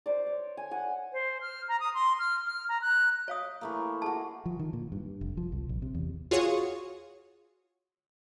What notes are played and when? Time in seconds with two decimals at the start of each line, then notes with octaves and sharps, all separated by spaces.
0.06 C5 D5
0.27 C#5
0.57 G#5
0.71 F#5 G#5
1.13 C5
1.41 F6
1.68 A#5
1.80 D#6
1.94 C6
2.19 F6
2.46 F6
2.69 A#5
2.82 F#6
3.28 C#5 F5 D#6
3.61 E3 A3 A#3
4.02 F#4 G#4 A5
4.46 F3
4.59 D#3
4.73 A#2
4.92 G2
5.21 F1
5.37 F3
5.52 C2
5.69 A#1
5.82 C3
5.94 E2
6.31 F4 F#4 G#4 C#5 C#6 D#6